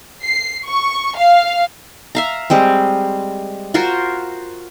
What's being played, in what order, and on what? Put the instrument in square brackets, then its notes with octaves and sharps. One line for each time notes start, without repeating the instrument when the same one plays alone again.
[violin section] C7
C#6
F5
[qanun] E5 F5 A#5
G3 G#3 C4
F4 F#4 A#4 C5